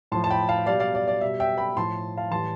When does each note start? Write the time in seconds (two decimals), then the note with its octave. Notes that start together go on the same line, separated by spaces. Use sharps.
0.12 A2 F3 A5 C6
0.24 A5
0.30 G5 B5
0.49 F5 A5
0.66 B2 G3 D5 F5
0.80 D5 F5
0.95 D5
1.08 D5
1.21 B2 G3 E5
1.40 E5 G5
1.58 G5 B5
1.76 A2 F3 A5 C6
2.17 F5 A5
2.31 A2 E3 G3 A5 C6